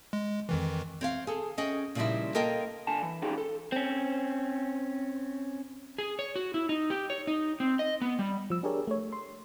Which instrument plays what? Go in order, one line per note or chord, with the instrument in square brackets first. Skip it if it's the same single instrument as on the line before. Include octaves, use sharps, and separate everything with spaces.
[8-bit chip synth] G#3
F2 D#3 E3
[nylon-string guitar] C4 C#5 F5
G#4 A4
C#4 G#4 D#5 G5
A#2 C#3 F3 G3 D#4 E4
A#3 F4 A4 A#4 D#5 G5
[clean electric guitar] D3 G#5 A5
E3
C#4 D#4 F4 G4 G#4
A4
[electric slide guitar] C4 C#4
G#4
C#5
F#4
E4
D#4
G4
C#5
D#4
C4
D#5
B3
G3
[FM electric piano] F3 E6
D4 G4 G#4 A#4 C#5 D5
A3 C#5
C6